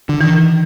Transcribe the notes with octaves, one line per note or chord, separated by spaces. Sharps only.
D3
D#3 E3